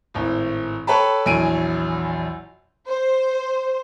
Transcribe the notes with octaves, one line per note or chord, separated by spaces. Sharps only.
G#1 A2
A4 B4 C#5 G5 A5 B5
A#1 E2 F#3 G#5 D7 D#7
C5